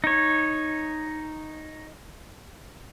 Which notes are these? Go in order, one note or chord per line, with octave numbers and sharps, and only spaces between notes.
D#4 C#5